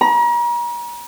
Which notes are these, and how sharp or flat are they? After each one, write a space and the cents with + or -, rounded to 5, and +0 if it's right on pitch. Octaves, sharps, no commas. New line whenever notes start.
A#5 +40